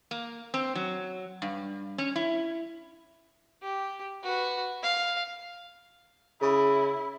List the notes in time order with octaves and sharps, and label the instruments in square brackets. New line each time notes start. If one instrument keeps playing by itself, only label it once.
[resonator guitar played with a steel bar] A#3
C4
F#3
G2
C#4
E4
[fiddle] G4
F#4 B4
F5
[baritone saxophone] C#3 [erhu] E4